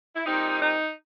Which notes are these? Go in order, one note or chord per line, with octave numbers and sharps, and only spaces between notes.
E4
A#2 G3 C4 D#4
D#4